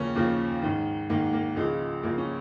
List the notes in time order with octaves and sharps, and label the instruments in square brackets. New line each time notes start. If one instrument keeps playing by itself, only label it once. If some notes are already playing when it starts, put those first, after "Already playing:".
Already playing: [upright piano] D#2 C#3 F3 A#3 C#4
D#2 C#3 F3 A#3
G#2 D#3
G#2 D#3 A#3
A#3
C#2 C#3 F3 G#3
C#2 C#3 F3 A#3
C#4